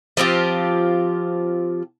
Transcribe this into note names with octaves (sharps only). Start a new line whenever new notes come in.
F3 C4 F4 G4